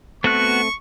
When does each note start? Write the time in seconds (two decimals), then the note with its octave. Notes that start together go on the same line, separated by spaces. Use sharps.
0.24 A3 B3 C4 F#4 A4 C#6 F#6